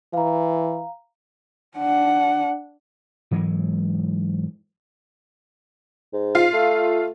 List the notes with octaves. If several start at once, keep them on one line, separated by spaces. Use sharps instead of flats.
E3 F5 A#5
D4 F#5
G#2 E3 F#3 G#3
G#2
F4 F5
A3